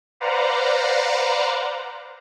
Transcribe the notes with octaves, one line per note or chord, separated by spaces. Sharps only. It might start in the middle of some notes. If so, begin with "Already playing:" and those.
B4 C5 D5 F5 F#5 A#5